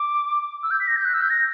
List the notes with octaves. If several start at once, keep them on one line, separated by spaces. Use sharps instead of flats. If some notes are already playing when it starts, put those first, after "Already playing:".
Already playing: D6
E6
G6
B6
A#6
G6
F#6
E6
G6
A#6